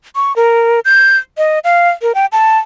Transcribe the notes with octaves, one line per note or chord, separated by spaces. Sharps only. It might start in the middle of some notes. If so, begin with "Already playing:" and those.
C#6
A#4
G6
D#5
F5
A#4
G5
A5